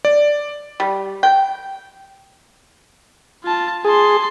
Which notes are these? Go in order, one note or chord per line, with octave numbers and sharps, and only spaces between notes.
D5
G3
G5
F4 A5
G#4 A5 C6